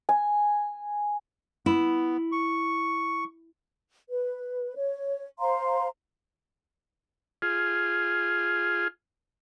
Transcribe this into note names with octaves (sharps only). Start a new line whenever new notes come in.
G#5
B3 E4
C#6
B4
C#5
C5 F5 A#5 C6
F4 G#4